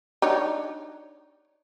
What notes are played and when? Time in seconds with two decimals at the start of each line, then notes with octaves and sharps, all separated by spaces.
0.22 D4 D#4 C#5